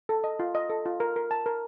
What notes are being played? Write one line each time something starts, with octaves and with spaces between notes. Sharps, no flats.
A4
D#5
F4
D#5
A4
F4
A#4
A#4
A5
A#4